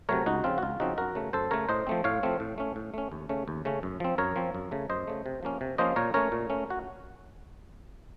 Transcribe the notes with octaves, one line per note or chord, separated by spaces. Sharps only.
C3 F#3 A3 A#4 C#5
C#2 D#4 F#4
C#3 F3 C4 F4
F#4
C#2 F4
C#3 F3 C4 D#4 F#4
F#2 F#4 A#4
C#3 A3
F#2 A4 C5
C#3 A3 A#4 C#5
A2 C5 D#5
F3 A3 C4
A2 C#5 F5
F3 A3 C4
A2
A3 C#4
A2
A3 C#4
D#2
C#3 A3 C#4
D#2
C#3 A3 C#4
F#2
F3 C4
F#2 A#4 C#5
F3 C4
F#2
C#3 A3
F#2 C5 D#5
C#3 A3
C3
F3 A#3 C#4
C3
F3 A#3 C#4 C5 D#5
A#2 A#4 C#5
A3 C#4 A#4 C#5
A#2
A3 C#4
F#4